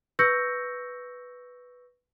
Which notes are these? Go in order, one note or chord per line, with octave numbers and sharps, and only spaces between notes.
B4 C#6 E6 G6 A#6 C#7